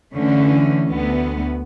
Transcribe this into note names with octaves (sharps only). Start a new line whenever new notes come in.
D3 E3 A3 C#4
D2 B3